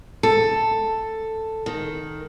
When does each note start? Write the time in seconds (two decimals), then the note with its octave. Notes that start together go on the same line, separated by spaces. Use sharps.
0.23 A4
1.66 D#3